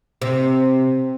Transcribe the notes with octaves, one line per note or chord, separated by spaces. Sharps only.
C3